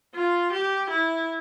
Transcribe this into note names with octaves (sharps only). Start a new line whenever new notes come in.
F4
G4
E4